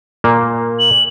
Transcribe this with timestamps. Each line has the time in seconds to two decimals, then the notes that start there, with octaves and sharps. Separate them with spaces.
0.24 A#2 A#3
0.79 F#7